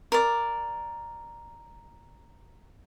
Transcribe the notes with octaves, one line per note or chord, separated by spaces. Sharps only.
A#4 D5